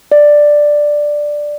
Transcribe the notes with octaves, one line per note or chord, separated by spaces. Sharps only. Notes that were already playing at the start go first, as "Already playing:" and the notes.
D5